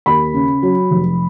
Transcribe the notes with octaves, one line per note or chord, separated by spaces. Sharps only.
D#2 B5
C#3
F#3
F1